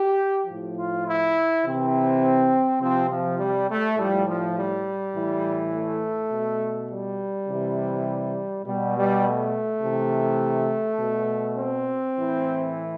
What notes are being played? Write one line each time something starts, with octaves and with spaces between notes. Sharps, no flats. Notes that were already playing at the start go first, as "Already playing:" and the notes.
Already playing: G4
F3
A2
F4
E4
C3 E3 C4
C3 F3 C4
F3
G3
A3
A2 F3 G3
F3
G3
A2 E3
A3
B2
G3
C3 E3
B2 G3
G3
A3
C3 E3
B2
C4
A2 E3